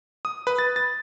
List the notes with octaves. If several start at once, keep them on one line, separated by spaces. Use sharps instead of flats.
D#6
B4
A6
A6